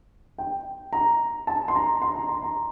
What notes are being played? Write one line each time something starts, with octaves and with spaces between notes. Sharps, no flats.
G5
A#5
A5
C6
A#5
C6
A#5
C6
A#5